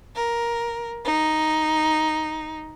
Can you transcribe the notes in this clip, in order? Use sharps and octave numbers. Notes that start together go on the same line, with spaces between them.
A#4
D#4